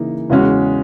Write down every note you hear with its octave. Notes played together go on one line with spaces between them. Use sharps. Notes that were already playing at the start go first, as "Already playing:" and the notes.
Already playing: C#3 E3 A#3 D#4
E2 C#3 G#3 C#4 F#4